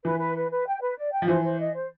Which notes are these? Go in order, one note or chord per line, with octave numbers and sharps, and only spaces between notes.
E3 B4
B4
B4
B4
G5
B4
D5
G5
F3
E3 C5
C5
D#5
C5